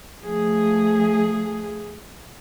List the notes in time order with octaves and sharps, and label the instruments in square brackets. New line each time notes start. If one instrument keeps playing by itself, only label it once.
[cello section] F3 A3 G#4